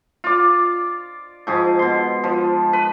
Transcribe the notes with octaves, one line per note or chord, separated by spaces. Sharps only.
F4 D5
G#2 F3 G#4
B2 C6
F3
B4